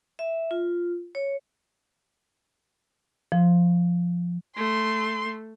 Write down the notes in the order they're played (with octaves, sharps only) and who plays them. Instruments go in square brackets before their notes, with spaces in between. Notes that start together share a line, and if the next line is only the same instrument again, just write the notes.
[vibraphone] E5
F4
C#5
[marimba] F3
[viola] A3 [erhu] C6